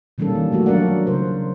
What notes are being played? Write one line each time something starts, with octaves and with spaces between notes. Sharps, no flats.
B2 D#3 G3 A#3 C#4 A4
E3
F#3 A3 A#3 F#4
F3 F#3 D4 A#4 D5 F#5
C#3 A#4 C5